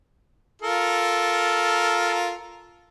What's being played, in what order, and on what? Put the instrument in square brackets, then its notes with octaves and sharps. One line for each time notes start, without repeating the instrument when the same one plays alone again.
[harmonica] F4 A4 A#4